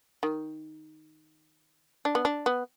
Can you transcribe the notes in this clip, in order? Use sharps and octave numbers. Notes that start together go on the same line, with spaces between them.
D#3
D4
B3
D4
B3